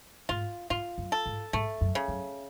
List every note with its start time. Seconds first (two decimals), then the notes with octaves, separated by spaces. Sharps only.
0.29 G#2 F4
0.70 G#2 F4
0.98 F#2
1.12 A4
1.26 G#2
1.53 G#2 A3
1.81 F#2
1.95 C#3
2.08 F#2